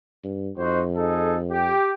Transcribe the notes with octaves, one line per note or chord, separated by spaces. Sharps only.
G2
F2 D#4 F#4 C5
D#4 G#4 A4
G4